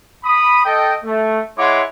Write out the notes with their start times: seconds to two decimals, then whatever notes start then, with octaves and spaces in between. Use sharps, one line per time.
0.24 B5 D#6
0.65 A4 D#5 G5
1.04 A3
1.57 G#3 E4 C#5 F#5 C6 D6